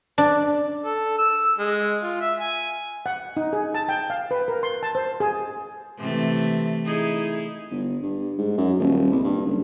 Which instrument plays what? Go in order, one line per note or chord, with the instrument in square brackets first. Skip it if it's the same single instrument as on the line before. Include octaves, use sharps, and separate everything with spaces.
[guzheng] D4
[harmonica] A4
E6
G#3
F4
E5
G#5
[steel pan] F#5
D#4
G#4
A5
G5
F5
B4
A#4
C6
A5
C5
G#4
[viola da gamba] C3 E3 A3
D#4 E4 G#4
[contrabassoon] G1
G2
G#2
F#2
D#1
C2
G2
F#1